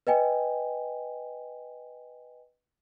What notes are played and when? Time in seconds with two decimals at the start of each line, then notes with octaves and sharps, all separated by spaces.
0.07 B4 D#5 G5 G#5